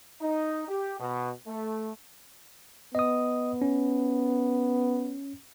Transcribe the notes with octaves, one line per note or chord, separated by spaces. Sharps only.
D#4
G4
B2
A3
B3 D#5 D#6
C#4